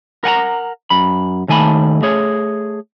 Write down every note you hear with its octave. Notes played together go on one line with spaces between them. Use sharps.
A#4 F#5 G#5 A#5
F#2 B5
D#2 D#3 A3 G#5 A5 B5
A3 G#4 C#5